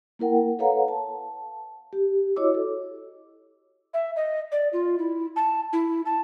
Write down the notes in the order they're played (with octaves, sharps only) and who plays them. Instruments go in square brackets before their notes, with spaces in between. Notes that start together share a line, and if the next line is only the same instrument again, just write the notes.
[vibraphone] A#3 E4 A#4 F#5 G5
A4 B4 C#5 F5 F#5 A#5
A5
G4
E4 F#4 C#5 D#5 D6 E6
A4
[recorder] E5
D#5
D5
F4
E4
A5
E4
A5